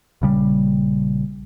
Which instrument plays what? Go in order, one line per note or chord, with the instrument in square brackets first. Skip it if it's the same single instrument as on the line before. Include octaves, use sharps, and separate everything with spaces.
[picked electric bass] A#1 C#3 G3